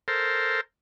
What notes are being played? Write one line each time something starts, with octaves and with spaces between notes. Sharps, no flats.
A4 A#4 C5